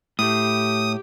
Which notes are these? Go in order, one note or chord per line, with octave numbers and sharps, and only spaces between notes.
A2 G4 D#6